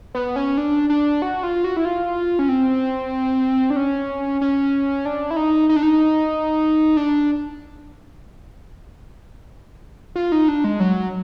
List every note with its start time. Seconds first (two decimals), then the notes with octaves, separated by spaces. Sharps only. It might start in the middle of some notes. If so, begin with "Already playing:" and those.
0.14 B3
0.36 C#4
0.57 D4
0.90 D4
1.22 F#4
1.43 F4
1.64 F#4
1.77 E4
1.85 F4
2.39 C#4
2.49 C4
3.70 D4
3.76 C#4
4.41 C#4
5.05 D4
5.31 E4
5.36 D#4
5.69 D#4
5.76 D4
5.83 D#4
6.97 D4
10.16 F4
10.32 D#4
10.48 D4
10.64 G#3
10.80 F#3